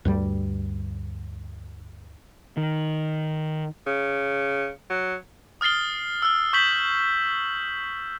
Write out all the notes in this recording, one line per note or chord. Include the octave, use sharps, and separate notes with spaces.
D2 G2 G3
D#3
C#3
F#3
D#6 F6 A6 C7 G7
E6 F6
C#6 G6 B6 F#7